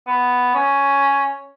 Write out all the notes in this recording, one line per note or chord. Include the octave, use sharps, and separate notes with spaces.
B3
C#4